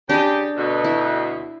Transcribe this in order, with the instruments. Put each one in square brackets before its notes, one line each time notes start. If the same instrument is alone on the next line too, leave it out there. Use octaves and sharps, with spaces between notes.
[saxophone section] C#3 G4 [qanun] D4 D#5
[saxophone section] D2 B2
[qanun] E4